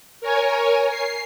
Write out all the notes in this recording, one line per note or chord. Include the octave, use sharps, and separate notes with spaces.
A#4 C#5 G#5
C7